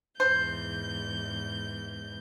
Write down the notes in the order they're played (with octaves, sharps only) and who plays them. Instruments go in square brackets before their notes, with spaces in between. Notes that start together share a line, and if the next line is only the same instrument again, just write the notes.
[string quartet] E2 G#2 G6 [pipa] C5